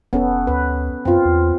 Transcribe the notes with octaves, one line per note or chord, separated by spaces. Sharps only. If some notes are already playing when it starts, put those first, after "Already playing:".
F1 B3 C#4 A4
D2 B4
F#2 C4 F4
E2